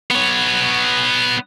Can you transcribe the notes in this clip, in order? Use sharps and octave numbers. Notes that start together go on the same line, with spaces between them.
B3 C#5